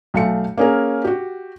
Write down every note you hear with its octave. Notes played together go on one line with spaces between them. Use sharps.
B1 A3 F5 C#7
A#3 C#4 G#4 A#4
F#4 G4